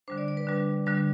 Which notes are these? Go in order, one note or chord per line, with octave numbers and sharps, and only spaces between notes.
D3 G3 D4 C5
D5
D5
B4
D3 G3 D4
D3 G3 D4